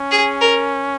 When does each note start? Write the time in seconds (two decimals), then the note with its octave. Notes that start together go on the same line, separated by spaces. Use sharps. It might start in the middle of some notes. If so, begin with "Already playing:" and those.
Already playing: C#4
0.11 G#4
0.41 A#4